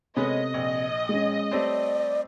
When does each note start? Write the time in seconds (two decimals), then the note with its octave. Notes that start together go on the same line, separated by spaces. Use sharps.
0.16 C3 G#3 B3 C#4 A4 D#5
0.54 A#1
1.09 G#3 C#4
1.51 G3 A3 C4 C#5 D5